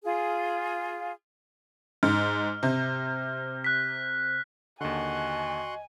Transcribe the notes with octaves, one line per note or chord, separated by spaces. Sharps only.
F4 G#4
G#2 F6
C3
F#6 B6
D#2 D3 F#4 D#5 F#5 G#5 C6